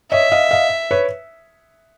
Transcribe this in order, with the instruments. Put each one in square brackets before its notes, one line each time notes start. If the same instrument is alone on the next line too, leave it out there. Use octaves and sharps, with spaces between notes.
[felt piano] C#5 D#5 [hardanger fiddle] E5
[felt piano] D#5 F5
D#5 F5
B4 C#5